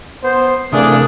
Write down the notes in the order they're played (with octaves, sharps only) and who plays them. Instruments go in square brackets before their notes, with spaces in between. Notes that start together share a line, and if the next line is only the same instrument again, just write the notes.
[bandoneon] B3 [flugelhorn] C5
[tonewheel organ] C3 A#4 F5 [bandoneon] E3 G#4 D#6 [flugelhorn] A3 [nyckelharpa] D4